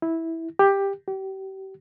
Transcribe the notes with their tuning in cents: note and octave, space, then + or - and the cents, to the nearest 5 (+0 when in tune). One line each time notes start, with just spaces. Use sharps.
E4 -10
G4 +10
G4 -35